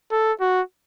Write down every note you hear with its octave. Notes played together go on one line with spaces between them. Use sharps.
A4
F#4